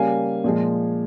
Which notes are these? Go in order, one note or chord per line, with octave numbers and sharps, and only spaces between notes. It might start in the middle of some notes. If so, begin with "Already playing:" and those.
Already playing: C#3 G3 A#3 C#4 F5 G#5
A#2 F3 G#3